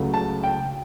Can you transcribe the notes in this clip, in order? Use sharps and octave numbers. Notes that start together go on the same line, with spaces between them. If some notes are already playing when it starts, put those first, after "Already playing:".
Already playing: C#2 C#3 F#3 A3
A5
G5